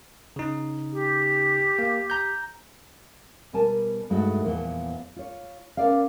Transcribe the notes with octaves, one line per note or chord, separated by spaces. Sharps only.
C#3 D#4
G4
A#3
A#5 G6
B2 G3 A#4 G#5 A5
G2 G#3 A3 D#4 F#4 E5
E2 A#2 F3 B3
F4 C#5
B3 C#4 A#4 D5 E5 F5